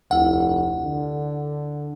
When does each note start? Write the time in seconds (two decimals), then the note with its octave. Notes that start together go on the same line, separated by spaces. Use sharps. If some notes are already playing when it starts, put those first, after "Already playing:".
0.11 F1 D2 E4 F#5
0.84 D3